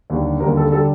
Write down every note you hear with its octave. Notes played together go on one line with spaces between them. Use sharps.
D#2 D3 G3
D#2 D3 G3 A#4
A4
D3 G3 A4